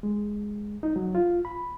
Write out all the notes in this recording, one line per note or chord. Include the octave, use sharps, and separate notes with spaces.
G#3
D#4
F#3
F4
B5